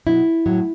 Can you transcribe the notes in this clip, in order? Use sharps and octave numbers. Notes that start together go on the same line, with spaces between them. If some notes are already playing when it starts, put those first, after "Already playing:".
B2 F#3 E4
A2 F#3